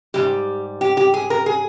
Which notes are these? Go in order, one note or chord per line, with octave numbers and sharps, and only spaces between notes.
G#2 E3 G3 G4
G4
G4
G#4
A#4
G#4